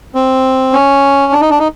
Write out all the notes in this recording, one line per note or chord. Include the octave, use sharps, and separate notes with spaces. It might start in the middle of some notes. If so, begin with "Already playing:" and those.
C4
C#4
D4
D#4
D4
D#4